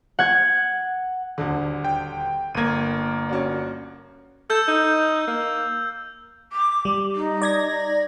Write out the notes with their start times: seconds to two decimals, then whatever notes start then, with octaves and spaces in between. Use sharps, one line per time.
0.19 F#5 G#6
1.38 D#1 D2 D3
1.84 G5
2.55 G1 A#3 G#6 D#7
3.29 C#4 F#4 D5
4.50 A4 E6 G6
4.68 D#4
5.28 A#3
6.52 D6
6.85 G3
7.15 D#4
7.42 D5 G#6 A#6